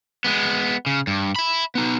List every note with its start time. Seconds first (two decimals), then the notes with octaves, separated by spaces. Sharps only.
0.24 G#3 B3
0.86 C#3
1.07 G2
1.36 E5 B5
1.75 B3 D#4